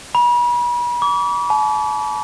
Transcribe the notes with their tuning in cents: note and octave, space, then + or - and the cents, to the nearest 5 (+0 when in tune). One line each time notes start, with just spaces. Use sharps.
B5 -40
D6 -40
A5 -45